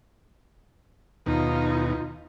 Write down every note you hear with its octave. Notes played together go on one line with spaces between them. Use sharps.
D#2 B2 D#4 F4